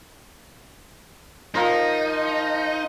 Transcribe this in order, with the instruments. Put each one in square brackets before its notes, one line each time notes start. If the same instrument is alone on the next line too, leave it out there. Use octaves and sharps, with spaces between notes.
[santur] F3 A#4 C5 [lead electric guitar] D#4